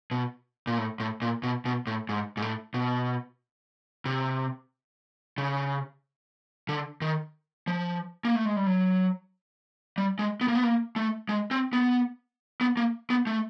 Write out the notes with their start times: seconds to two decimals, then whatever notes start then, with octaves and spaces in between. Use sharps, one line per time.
0.11 B2
0.67 A#2
0.78 A2
1.00 A2
1.22 A#2
1.43 B2
1.65 B2
1.87 A2
2.09 G#2
2.37 G#2
2.42 A2
2.74 B2
4.05 C3
5.38 C#3
6.69 D3
7.01 D#3
7.67 F3
8.25 A#3
8.35 A3
8.45 G#3
8.56 G3
8.67 F#3
9.98 G3
10.19 G#3
10.41 B3
10.48 A#3
10.55 B3
10.63 A#3
10.96 A3
11.29 G#3
11.51 C4
11.73 B3
12.61 B3
12.77 A#3
13.10 B3
13.27 A3